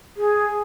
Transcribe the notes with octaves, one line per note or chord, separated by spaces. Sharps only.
G#4